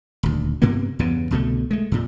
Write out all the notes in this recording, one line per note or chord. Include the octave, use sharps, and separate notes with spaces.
D#1 D2
G2 C3 A#3 B3
E2 G2 C#3 B3
C2 B2 D3 A3
G#3 A3
F2 A#2